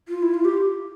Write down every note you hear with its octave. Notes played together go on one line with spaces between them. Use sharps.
F4
E4
F4
G4